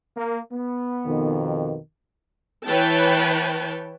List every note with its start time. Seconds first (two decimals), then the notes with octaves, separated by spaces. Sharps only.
0.16 A#3
0.51 B3
1.05 F2 B2 D#3
2.66 E3 B4 C#5 G5 A5